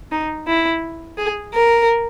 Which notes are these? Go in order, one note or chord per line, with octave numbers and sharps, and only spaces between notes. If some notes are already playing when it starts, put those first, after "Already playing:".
D#4
E4
G#4
A#4